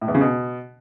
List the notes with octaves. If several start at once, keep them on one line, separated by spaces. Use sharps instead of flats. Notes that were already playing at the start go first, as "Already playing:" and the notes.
A2
E2
C#3
B2